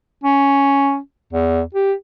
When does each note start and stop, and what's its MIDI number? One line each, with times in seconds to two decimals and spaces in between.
0.24 0.97 61
1.33 1.61 40
1.74 1.93 67